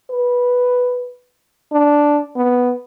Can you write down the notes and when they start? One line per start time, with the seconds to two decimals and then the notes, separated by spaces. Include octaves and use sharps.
0.10 B4
1.72 D4
2.36 B3